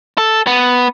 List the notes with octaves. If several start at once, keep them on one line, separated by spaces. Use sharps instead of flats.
A4
B3